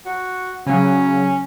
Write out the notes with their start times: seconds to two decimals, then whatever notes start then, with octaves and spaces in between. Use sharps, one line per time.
0.06 F#4
0.67 C#3 F#3 C#4